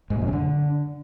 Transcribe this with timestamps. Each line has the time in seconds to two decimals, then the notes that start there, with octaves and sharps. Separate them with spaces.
0.10 G#2
0.16 A#2
0.22 F#2
0.27 C#3
0.33 D3